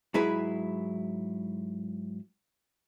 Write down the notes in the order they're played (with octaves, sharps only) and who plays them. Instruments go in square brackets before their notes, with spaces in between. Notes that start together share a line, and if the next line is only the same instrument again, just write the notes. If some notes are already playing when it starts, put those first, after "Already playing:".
[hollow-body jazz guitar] G#2 F#3 E4 G#4 B4